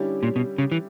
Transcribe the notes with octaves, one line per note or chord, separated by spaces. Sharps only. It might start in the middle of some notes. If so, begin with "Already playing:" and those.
Already playing: D3 G3 C#4 E4 G4
A#2
B2
C#3
E3